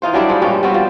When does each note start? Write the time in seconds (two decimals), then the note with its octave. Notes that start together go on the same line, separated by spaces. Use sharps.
0.02 E3 D#4 F4 C5
0.13 F#3 G3 D4 E4
0.29 G#2 F3 G#3
0.42 G2 A#2 G3 C#4
0.63 G3 B3 C4 F#4
0.74 F3